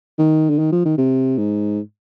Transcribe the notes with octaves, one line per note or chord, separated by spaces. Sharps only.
D#3
D3
D#3
F3
D#3
C3
G#2